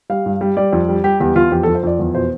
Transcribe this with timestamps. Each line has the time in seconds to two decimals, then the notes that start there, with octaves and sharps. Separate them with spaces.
0.10 G3 F5
0.26 G2
0.41 G3
0.57 G3 D5
0.73 F2
0.88 G3
1.04 G3 G4
1.20 E2 G4
1.35 E2 F4
1.52 F2 G4
1.63 F2 A4
1.75 C5
1.83 F2 D5
1.99 E2
2.14 B2 C5